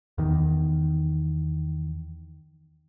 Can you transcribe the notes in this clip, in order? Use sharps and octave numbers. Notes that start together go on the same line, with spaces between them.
E2 D#3